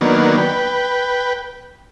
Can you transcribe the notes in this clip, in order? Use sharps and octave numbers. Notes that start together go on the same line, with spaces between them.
D#3 F#3 A#3 B3 D4
B4 G5